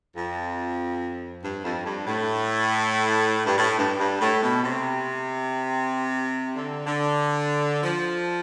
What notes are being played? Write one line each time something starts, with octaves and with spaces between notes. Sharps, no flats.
F2
G2
F2
G2
A2
G2
A2
G2
G2
A2
B2
C3
D3
D3
F3